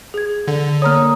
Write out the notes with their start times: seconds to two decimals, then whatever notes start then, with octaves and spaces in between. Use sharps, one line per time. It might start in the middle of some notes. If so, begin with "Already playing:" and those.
0.14 G#4 G#6
0.48 D3
0.82 A#3 C#5 A#5 D#6 F6